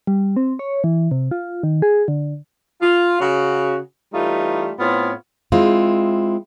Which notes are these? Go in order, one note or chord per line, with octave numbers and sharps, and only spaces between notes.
G3
C4
C#5
E3
C3
F4
D#3
G#4
D3
F4
C#3 F#4
E3 G3 A3 D#4 F4
A2 B3 C4 F4 C#5
G#3 C4 E4 F4